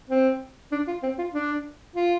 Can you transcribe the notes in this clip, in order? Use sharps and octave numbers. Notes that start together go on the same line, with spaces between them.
C4
D4
F4
C4
F4
D4
F4